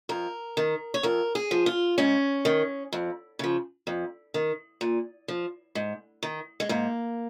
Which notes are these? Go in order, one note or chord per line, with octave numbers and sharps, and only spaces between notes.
F2 A#4
D#3
C#5
F2 A#4
G#4
F3
F4
G#2 C#4
D#3
F2
C#3 F3
F2
D#3
A#2
F3
G#2
D#3
G#3
G#2 A#3